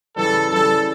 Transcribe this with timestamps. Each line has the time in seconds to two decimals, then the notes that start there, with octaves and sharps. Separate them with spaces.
0.16 C#3 E3 G3 A4
0.51 C#3 E3 G3 A4